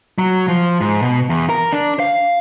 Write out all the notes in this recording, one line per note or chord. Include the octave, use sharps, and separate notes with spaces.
F#3
F3
G#2
B2
E2
A#4
D4
F5